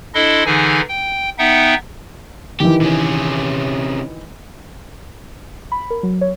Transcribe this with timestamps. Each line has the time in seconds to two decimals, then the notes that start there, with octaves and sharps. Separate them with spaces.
0.14 D4 E4 A4 D#5 C6
0.46 D3 E3 D#4 G#4 G#5
0.89 G5
1.38 B3 D#4 E5 F#5 G5
2.60 D#3 E3 G4
2.81 C3 C#4
5.72 B5
5.90 A#4
6.03 F#3
6.21 C#5